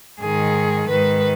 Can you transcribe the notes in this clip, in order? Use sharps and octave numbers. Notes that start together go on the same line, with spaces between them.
G#2 D#3 G#4
G#2 D#3 B4